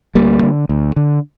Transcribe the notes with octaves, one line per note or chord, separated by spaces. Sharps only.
D2 G3 A#3
D3
D2
D3